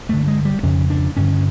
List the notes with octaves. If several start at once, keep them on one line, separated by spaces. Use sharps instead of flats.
G2 D3 A3
G#3
G3
F2 C#3 C#4
D4
G2 D3 C#4